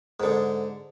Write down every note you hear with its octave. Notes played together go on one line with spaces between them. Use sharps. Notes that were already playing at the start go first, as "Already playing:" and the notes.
G#2 D3